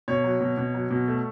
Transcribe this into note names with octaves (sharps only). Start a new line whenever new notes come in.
B2 C#5
F#3
B2
B2
F#3
B2
A3